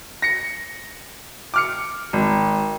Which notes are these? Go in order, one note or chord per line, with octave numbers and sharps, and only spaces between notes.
A#6 C#7
D6 F6 C#7
G#1